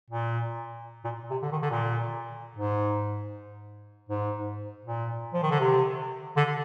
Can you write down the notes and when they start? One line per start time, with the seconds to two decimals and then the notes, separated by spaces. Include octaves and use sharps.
0.10 A#2
1.04 A#2
1.30 C3
1.42 D3
1.52 D#3
1.62 D3
1.70 A#2
2.56 G#2
4.09 G#2
4.85 A#2
5.33 F3
5.42 D#3
5.50 D3
5.60 C3
6.36 D3